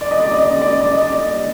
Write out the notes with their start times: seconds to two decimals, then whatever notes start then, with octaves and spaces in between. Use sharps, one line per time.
0.01 D5
0.11 D#5
0.20 D5
0.31 D#5
0.41 D5
0.51 D#5
0.61 D5
0.70 D#5
0.81 D5
0.91 D#5
1.02 D5
1.12 D#5
1.21 D5
1.31 D#5